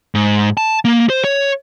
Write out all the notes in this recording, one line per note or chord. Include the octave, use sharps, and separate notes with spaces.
G#2
A5
A#3
C5
C#5